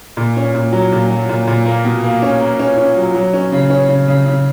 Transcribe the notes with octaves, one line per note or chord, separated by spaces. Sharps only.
A#2
C#4
A#2
F#3
A#2
F#3
A#2
A#2
A#3
B2
A#3
C#4
A#3
C#4
C#4
F#3
F#3
C#4
C#3
C#4
C#3
C#3
C#3